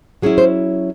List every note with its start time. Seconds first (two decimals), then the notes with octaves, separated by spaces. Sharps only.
0.22 F#3 C#4 E4 G#4
0.38 C5